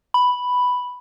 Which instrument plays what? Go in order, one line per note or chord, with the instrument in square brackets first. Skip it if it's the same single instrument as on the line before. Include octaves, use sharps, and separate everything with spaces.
[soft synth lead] B5